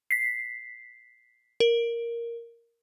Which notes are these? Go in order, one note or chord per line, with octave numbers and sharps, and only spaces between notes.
B6 C7
A#4